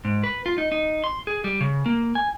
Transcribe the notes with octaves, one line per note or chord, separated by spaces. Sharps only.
G#2
B4
F4
D#4
D#4
C6
G#4
G3
C#3
A#3
G#5